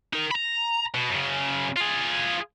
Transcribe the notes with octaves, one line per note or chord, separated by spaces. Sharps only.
D#4 A#4
A#5 B5
B2
F#2 C#3
F4 G#4